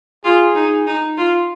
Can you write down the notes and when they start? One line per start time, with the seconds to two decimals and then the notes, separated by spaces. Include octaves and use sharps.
0.24 F4 G#4
0.55 D#4
0.87 D#4
1.17 F4